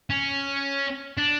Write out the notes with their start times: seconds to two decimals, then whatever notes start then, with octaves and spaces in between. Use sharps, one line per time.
0.10 C#4
1.18 D4